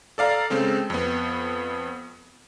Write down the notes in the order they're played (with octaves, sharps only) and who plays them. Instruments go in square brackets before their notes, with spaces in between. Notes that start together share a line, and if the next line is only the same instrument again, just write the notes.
[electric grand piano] A4 D5 F5 A#5
C#3 G#3 C4 A4
F2 B3